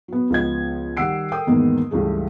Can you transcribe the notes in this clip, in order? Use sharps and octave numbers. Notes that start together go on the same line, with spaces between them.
F#3 B3
C#2 F3 B3 D#5 G#6
D#3 G3 F#5 E6 C7 D7
A4 A#4 G5 D#6
E2 G#2 D#3 A#3 B3
C#2 G2 E3 A3 G#4